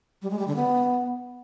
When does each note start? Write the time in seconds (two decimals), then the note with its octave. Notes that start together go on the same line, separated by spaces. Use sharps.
0.22 G3
0.31 G#3
0.39 G3
0.47 D3
0.56 B3